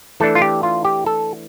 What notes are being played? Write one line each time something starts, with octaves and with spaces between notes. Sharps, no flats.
E3 A3 D4 A4
F4
G4
F4
G4
A4